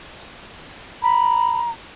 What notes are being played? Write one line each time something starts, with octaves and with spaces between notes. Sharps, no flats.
A#5 B5